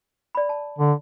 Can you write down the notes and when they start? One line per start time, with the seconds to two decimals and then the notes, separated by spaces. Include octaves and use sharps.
0.35 D5 B5
0.49 A5
0.78 D3